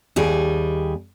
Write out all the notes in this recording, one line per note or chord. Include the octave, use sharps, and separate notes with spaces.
D#2 G3 G#4